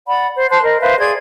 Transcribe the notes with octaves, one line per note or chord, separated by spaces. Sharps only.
D5 F#5 B5
C5
C5 A5 C6 F#6
A#4 D#5
B4 C5 E5 F5
G#4 D5 C6 G#6